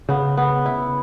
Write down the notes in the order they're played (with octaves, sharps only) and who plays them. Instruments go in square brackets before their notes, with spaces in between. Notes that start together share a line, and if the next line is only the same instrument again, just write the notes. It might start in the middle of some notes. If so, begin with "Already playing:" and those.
[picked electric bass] C#3 [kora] B3
[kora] B3
E4